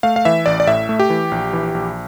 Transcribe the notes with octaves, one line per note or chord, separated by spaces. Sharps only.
A3 F5
F5
E3 E5
A1 D5
D5
A2 E5
A3
G4
E3
A#1
E3
A#1